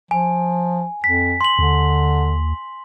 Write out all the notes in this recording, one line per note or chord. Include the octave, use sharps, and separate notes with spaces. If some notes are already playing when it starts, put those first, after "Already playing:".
F3 G#5
F2 B6
C6 F#7
D#2 D3